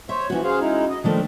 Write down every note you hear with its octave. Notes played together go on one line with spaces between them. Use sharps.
C5 C#5 E5
E3 F3 C#4 F#4
G#4 C5 F5
G#3 D#4 E4
D#5
D#3 F3 A3 C4 D4